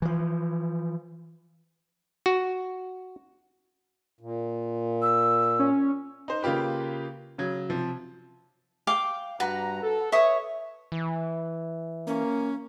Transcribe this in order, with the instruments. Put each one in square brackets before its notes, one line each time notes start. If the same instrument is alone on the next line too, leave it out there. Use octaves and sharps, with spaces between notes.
[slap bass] E3 F3
[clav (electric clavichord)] F#4
[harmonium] A#2
[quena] E6
[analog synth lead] C#4
[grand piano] D#4 C5
C#3 A#3 F4 G4 B4
C#3 F#3 G#6
C3 F3
[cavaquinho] F5 G5 D6
[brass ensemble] G2 A#5 [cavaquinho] F#4 B4
[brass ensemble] A4
[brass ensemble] B4 C#5 [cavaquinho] E5 C#6 D#6
[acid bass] E3
[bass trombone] A#3 [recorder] C#4